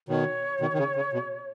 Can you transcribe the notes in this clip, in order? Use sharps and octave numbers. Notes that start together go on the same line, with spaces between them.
B2 D#3 C#5
B2 D#3
D#3
C#3
C#3
B2